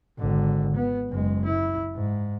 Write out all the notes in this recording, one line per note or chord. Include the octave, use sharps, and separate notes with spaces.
G#1 D3
B3
F#1 G#3
E4
G#2